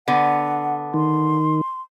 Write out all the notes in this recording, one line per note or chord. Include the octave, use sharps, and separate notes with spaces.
D3 B3 F#5
D#3 C6